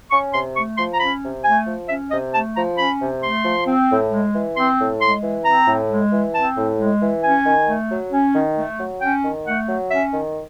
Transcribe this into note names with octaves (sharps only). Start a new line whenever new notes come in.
C#4 C#6
C3 C6
A3 C#6
F3 C6
A#5
C#4 B5
C3
A3 G#5
F3
C#4 E5
C3 D#5
A3 A5
F3 A#5
C#4 B5
C3
A3 C6
F3
C4
A2
G#3
E3
C4 C6
A2
G#3 C6
E3
C4 A#5
A2
G#3
E3
C4 A5
A2
G#3
E3
C#4 G#5
D#3
A3
F#3
C#4
D#3
A3
F#3
C#4 G5
D#3
A3 F#5
F#3
C#4 E5
D#3